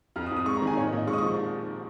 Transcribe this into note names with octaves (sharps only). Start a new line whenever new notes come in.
F2 F6
D#6
F2
D#6
G#3 C#6
A#5
D#3
G#5
A#2 C#5
D#5
A#2
D#5
G#3 C#6
D#6
C#6
F3